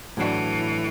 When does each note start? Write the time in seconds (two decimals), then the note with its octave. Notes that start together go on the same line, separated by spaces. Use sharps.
0.17 A2 E3 F#3 D4 F#4